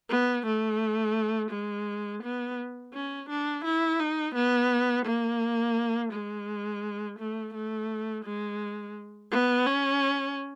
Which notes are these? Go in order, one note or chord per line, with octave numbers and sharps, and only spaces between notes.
B3
A3
G#3
B3
C#4
D4
E4
D#4
B3
A#3
G#3
A3
A3
G#3
B3
C#4